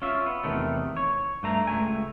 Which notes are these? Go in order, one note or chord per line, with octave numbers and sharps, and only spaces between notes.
C#4 F4 E5
B3
E2 C3 D#3 A3
C#5
G2 A3 A#5
C#2 A3 G#5